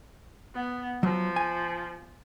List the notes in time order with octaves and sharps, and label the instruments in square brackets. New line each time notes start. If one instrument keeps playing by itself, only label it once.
[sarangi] B3
[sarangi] F3 [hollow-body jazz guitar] F#3
[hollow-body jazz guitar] G#5